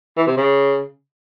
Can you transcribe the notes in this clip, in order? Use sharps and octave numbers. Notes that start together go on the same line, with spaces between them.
E3
C3
C#3